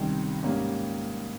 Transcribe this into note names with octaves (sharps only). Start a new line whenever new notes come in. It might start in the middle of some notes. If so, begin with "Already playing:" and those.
Already playing: C#2 C3 D#3 G3
G#2 G3 A#3 C#4